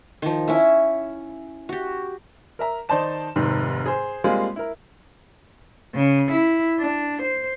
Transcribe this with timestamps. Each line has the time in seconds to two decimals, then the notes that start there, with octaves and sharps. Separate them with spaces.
0.22 D#3 F3
0.48 C#4 E4 E5
1.69 F#4 G4
2.59 A#4 E5 A#5
2.89 D#3 D#4 C5 D5 A5 E7
3.36 F1 G#2 C3 D#3
3.86 G#4 C5
4.24 G3 G#3 A#3 C4 F4 G#4
4.56 E4 A#4
5.95 C#3
6.32 E4
6.80 D4
7.23 C5